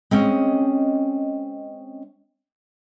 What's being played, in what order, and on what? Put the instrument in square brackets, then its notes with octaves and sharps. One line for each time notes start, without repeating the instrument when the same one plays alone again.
[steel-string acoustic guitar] G#3 C4 C#4 D#5